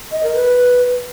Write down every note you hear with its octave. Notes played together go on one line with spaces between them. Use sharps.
D#5
A#4
B4